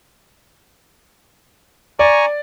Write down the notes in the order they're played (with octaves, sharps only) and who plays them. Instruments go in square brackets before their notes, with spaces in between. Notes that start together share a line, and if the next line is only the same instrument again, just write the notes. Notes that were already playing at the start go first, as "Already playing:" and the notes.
[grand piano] D5 [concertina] G#5 A#5 C#6